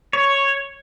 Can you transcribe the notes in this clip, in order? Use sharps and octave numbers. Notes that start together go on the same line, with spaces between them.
C#5